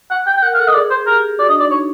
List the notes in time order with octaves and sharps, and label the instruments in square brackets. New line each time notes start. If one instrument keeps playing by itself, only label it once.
[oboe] F#5
G5
G5
[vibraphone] A#4 [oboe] F#5
[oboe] F5
[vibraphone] A4 [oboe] F#5
[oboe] D#5
[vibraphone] G#4 [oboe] D5
[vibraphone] G#4 [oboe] C5
[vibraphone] G4 [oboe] A#4
[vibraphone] F#4 [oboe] D5
[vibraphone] D4 [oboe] D#5
[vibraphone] D#4 [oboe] D5
[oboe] C#5